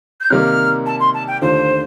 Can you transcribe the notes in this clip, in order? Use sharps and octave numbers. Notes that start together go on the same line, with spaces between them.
G6
C3 D#3 G3 A#3 D#4 F6
A5
C6
A5
G5
D#2 D3 A3 D4 F4 C5